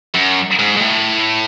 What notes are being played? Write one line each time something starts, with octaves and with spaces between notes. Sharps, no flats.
F#2
G#2
G#2
A2